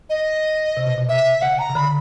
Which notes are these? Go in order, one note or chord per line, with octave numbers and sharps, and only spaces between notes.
D#5
C3
B2
B2
C3 E5
C#3 F#5
A#5
C#3
D3 B5